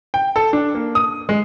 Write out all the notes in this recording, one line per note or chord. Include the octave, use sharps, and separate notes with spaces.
G5
A4
D4
A#3
D#6
G#3